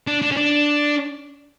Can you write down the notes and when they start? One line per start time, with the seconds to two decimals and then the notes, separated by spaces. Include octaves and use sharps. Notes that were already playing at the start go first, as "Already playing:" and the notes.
0.07 D4
0.22 D4
0.31 C#4
0.37 D4